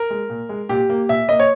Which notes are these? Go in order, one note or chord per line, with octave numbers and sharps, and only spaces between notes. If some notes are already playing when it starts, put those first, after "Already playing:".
Already playing: A#4
G#3
A#2
G#3
A#2 G4
A#3
A#2 E5
A#3 D#5
C#5